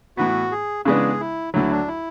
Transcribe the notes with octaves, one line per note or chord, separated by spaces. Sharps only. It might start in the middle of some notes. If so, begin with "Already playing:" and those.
A2 E3 B3 F#4
G#4
C#3 E3 G#3 B3 D4 G#4
E4
D2 D3 F#3 E4
D4
E4